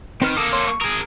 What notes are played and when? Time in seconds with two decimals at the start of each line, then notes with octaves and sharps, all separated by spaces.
0.22 D#3 C4 B4 F6
0.37 A#3 A4 D#6 E6
0.53 C#5 C6
0.67 C#6
0.81 G#4 A#4 D#6